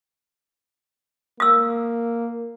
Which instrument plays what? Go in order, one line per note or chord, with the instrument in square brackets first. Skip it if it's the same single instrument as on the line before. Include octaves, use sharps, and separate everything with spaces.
[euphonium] A#3 [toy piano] D#6 E6